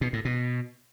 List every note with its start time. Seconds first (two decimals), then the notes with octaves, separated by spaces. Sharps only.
0.01 B2
0.13 A2
0.25 B2